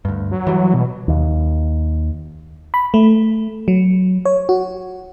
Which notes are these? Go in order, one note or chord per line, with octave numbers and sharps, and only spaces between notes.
D2 G2
F#3
E3 G3
B2
D#2
B5
A3
F#3
C#5
F#4